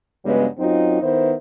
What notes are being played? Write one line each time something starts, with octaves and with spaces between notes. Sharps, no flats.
G2 C#3 F#3 G#3 B3
F#2 F#3 C4 D#4 F4
D#3 B3 E4 C5